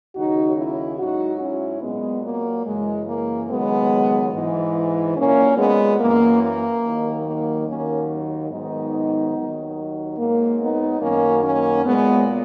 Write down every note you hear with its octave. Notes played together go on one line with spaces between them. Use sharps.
D#2 C#3 F#3 D#4 F#4
C#4 E4
G#2 F#3 D#4 F#4
C#4 E4
A#2 F#3 G#3 B3
A#3
F#2 C#3 E3 G#3
A#3
D#2 C#3 F#3 G#3 B3
G#2 E3
A#2 F#3 A#3 C#4
G#3 B3
F#2 E3 A#3
A#3
D#2 D#3 F#3
A#3
D#2 D#3 F#3 A#3 C#4
G#2 D#3 F#3 B3 D#4
D#2 D#3 F#3
G#2 F#3 A#3
B3 D#4
F#2 D#3 F#3 A#3 C#4
A#3 C#4
A#2 F#3 G#3 B3